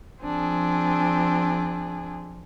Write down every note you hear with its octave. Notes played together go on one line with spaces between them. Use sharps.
F3 C4 D4 G#4